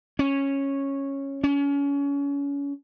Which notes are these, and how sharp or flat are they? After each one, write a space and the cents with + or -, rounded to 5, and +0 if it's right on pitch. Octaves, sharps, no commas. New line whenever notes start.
C#4 -10
C#4 +30